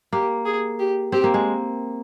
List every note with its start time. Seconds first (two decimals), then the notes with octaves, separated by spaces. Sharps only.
0.13 A#3 G4
0.45 G#4
0.79 G4
1.12 C4 G4
1.24 A#3
1.34 G#3